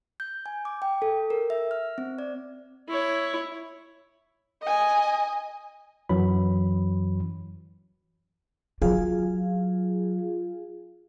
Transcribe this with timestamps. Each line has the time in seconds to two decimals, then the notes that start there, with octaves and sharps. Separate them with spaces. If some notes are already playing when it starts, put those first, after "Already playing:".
0.20 G6
0.46 G#5
0.65 D6
0.82 G5
1.02 A4
1.30 A#4
1.50 E5
1.71 F6
1.98 C4
2.19 D5
2.88 E4 C#5
4.62 D#5 G#5
6.09 F#2 E3 F#3 B5
8.82 F#3 F4 G#4 F5